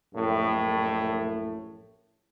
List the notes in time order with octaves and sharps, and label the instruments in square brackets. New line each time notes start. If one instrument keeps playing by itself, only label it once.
[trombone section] A#1 F#2 A2